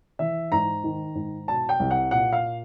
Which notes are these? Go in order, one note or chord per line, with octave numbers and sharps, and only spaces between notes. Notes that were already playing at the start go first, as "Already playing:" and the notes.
E3 E5
G#2 A#5
D#3
G#2
B2 A5
G5
C2
F#5
A#2 F#5
F5